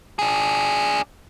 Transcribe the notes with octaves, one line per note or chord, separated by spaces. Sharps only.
D4 G#4